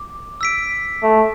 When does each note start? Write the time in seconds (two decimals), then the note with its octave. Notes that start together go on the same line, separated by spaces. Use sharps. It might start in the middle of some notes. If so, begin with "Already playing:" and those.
Already playing: D6
0.41 E6 B6 D7
1.03 A3